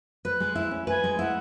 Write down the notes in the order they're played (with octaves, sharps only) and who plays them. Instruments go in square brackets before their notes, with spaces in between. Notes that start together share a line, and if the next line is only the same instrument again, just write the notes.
[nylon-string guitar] B4 [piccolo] F#6
[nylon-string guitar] G#3
E4
C#4
[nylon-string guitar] B4 [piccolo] G#5
[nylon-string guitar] G#3
[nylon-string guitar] E4 [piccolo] F#5